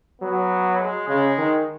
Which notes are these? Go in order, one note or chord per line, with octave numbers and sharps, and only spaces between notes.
F#3 B3
G#3
C#3 G#3
D#3